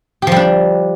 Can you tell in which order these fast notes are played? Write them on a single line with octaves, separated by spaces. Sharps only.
G4 F3 G3 D4